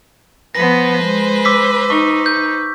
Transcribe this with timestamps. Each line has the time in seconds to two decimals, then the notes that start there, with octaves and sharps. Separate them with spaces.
0.55 F3 B3 B4 C5 A#6
1.04 G#3
1.45 D6 E6 B6
1.90 D#4 C#6
2.26 G6